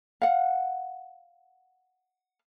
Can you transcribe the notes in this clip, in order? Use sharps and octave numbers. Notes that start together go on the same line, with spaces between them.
F5 F#5